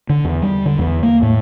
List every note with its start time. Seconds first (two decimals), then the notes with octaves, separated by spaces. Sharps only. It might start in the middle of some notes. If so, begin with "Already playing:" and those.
0.09 D3
0.25 E2
0.42 G3
0.65 D3
0.79 E2
1.03 A#3
1.23 A2